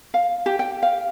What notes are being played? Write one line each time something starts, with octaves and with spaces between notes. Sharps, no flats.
F5
G4
G5
F5